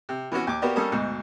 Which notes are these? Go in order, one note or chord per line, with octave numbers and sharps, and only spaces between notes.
C3
E3 B3 C#4 F#4
D#2 D6
A#3 B3 F#4 G4 D5
G3 A#3 C#4 A4 D#6
D2 G#2 B2